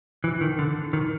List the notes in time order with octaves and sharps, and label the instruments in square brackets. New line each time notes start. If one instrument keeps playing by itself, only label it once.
[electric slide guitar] E3
D#3
D3
D#3